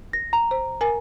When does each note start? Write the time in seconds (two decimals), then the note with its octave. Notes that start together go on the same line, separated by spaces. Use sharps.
0.13 A#6
0.33 A#5
0.51 C5
0.81 A#4 G#5